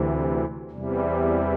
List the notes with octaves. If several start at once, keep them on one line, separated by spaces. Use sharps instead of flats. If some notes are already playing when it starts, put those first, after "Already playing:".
Already playing: D2 C3 E3
E2 C3 E3 G3